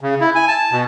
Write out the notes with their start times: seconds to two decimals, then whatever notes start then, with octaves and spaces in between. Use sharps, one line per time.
0.01 C#3
0.21 E4
0.35 G#5
0.48 A5
0.72 B2